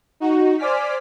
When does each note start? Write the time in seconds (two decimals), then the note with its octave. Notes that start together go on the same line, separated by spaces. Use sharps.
0.20 D#4 F#4
0.58 C5 D5 G#5 D6 F6 B6